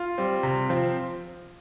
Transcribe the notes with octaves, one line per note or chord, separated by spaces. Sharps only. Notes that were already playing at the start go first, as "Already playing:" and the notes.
Already playing: F4
G3 C4
C3
F3 C4